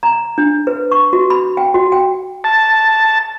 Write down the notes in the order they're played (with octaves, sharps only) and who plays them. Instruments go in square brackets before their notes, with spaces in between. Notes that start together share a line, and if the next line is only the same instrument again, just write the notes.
[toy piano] A#5
D4
B4
C#6
F#4
B5
G5
F#4
G5
[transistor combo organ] A5